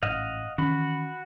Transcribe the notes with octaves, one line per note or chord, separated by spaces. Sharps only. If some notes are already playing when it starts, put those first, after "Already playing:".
A1 G#2 D#5 F5 F#5
D#3 E3 C#4 F#4 B5